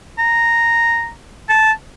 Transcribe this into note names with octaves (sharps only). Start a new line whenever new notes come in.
A#5
A5